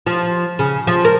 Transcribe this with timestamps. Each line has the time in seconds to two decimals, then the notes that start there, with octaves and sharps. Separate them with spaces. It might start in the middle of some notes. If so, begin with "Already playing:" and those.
0.06 F3
0.59 C#3
0.87 F3
1.05 A#4